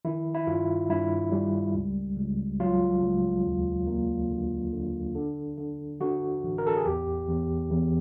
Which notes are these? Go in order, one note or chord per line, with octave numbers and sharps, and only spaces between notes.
D#3 E4
E4
G2 F4
G2 E4
G3
C#2
C#2
F#3 F4
C#2
D#2
A#3
D3
D3
D3
D3
D3 F#4
A1
A#4
A4
G#4
E2 G4
E2
E2